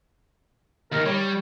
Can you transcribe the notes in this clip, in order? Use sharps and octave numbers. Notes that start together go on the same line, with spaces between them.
D#2 D#3 A#4
G3 C#5